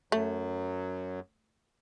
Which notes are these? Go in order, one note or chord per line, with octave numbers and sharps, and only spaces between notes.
F#2 F#3 A3